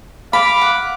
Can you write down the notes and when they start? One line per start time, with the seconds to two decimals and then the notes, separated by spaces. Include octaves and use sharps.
0.33 F5 B5 D6
0.62 F#5